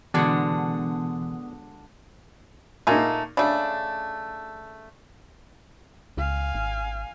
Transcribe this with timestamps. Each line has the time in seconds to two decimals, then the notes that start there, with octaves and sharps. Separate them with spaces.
0.14 B2 D3 E3 G#3 B3 D4 F#4 D#6
2.87 A#2 A3 A#3 D#4 G#5 A#5
3.37 C#3 A3 D4
6.17 C#2 F5 G#5
6.55 G#1